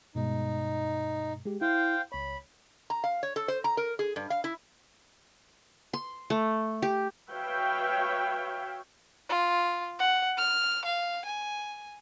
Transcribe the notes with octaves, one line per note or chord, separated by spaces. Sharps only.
G2 B2 G#3 D#4
G#3 G4
E4 C5 F5 G5
C#2 C#5 B5
A#5
F5
C#5
A4
C5
A#5
A#4
G#4
G2
F5
E4
C6
A3
G4
F#4 B4 C#5 E5 F5 G5
F4
F#5
F6
F5
G#5